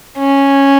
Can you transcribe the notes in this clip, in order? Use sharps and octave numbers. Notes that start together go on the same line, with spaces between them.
C#4